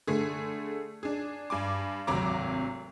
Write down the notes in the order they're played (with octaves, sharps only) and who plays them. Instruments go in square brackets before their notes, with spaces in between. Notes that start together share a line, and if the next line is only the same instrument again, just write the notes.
[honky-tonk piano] D3 A3 G#4
D4 G#4
G2 G#5 D6
G#1 D2 C3 F#3 A#5 D6